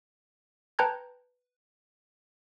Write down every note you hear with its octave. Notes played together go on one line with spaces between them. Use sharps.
B4 G5 A5 A#5 G6 G#6